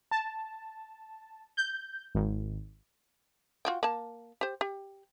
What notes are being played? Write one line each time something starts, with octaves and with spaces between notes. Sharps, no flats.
A5
G6
G#1
F4 F#4 G5
A#3 A5
G4 C5
G4